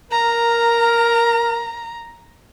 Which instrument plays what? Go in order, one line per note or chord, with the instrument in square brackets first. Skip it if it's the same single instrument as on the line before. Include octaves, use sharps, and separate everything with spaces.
[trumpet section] A#4 [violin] A#5